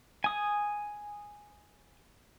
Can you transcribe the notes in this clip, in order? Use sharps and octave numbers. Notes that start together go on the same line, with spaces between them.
G#5 D#6